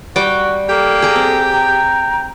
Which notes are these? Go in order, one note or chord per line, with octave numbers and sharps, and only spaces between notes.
G3 F#4 G5 D6
A#3 G4 A4
G#4 A#5
C4
G5 A#5